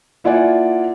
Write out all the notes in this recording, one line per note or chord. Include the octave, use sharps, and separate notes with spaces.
A#3 E4 F4 D5 F#5 G#5